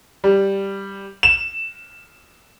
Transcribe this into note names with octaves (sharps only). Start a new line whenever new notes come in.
G3
E7